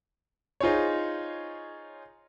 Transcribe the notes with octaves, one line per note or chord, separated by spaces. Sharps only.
D#4 F4 G#4 C5 C#5